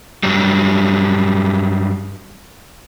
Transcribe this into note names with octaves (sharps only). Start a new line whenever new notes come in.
G2 F#3 G3